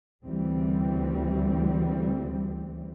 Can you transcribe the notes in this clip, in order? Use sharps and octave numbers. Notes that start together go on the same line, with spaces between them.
D2 C#3 E3 G3 C4